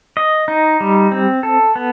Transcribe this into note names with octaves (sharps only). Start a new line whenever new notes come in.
D#5
D#4
G3
C4
A4
B3